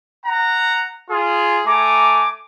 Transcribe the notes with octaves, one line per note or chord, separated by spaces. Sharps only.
F#5 A#5
F4 G#4
A3 G#5 A#5 D6